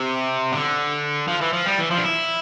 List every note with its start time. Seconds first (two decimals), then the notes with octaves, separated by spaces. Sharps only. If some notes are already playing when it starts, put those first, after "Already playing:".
Already playing: C3
0.52 D3
1.28 F3
1.41 E3
1.53 F3
1.66 G3
1.78 E3
1.91 F3
1.98 D4
2.04 E4